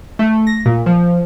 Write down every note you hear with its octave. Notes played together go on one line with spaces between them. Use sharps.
A3
A#6
A#2
F3